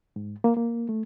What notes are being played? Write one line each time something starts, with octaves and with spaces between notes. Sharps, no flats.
G#2
A#3
A#3
A3